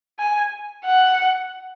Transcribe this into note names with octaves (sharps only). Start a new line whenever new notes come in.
G#5
F#5